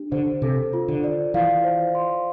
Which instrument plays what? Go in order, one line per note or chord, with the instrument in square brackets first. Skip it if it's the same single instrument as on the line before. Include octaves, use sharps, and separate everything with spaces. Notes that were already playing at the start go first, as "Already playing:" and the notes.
Already playing: [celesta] D4 G4
[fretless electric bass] D3 [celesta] C5
[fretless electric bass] C3 [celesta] A4
[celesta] F4
[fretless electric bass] D3
[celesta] D5
[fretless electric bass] E3 [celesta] F5
[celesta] C5
C6